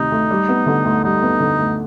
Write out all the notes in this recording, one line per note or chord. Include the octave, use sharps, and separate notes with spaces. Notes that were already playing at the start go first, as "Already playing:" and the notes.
Already playing: D2 C3 D#3 D#4
D2
G3
B3
D3
D2
G3 D#4
B3
D3
D2